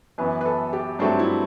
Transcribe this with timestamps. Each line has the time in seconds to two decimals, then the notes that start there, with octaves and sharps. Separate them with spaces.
0.18 F#2 E3 B3 B4
0.41 B4
0.46 A4
0.73 G4
0.99 G2 F#3 A3 C4
1.19 E4